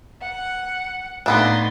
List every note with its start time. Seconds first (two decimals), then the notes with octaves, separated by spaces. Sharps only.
0.21 F#5
1.26 A2 A#3 B3 D4 D#4 C6